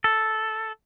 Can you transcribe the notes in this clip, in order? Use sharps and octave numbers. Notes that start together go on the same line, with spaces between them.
A4